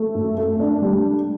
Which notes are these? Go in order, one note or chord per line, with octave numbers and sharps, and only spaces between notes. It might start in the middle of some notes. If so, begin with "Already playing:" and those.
Already playing: A3
F#2
A3
D4
G3